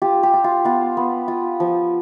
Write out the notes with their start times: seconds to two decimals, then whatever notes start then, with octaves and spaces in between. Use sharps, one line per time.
0.02 F4 G4
0.23 G4
0.34 F4
0.44 F4
0.65 B3 F4
0.97 B3
1.28 F4
1.60 F3